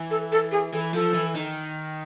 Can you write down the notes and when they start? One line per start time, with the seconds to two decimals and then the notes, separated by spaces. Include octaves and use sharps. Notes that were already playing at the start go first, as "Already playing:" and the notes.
Already playing: E3
0.11 A4
0.32 A4
0.52 G#4
0.73 E3 A4
0.94 F3 A4
1.14 E3
1.35 D#3